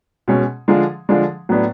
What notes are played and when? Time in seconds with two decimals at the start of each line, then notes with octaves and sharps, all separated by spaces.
0.28 B2 G#3 C#4
0.68 D3 F3 G#3 D4
1.09 D3 F3 G#3 D4
1.49 A2 F#3 B3 D4